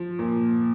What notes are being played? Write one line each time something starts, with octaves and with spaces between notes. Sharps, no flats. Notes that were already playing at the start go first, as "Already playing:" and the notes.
Already playing: F3
A#2